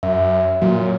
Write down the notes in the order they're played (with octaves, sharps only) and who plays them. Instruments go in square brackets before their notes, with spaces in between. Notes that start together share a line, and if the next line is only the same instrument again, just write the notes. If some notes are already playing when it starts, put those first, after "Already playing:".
[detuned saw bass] F#2 [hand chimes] E5
[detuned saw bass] A#2 [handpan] F#3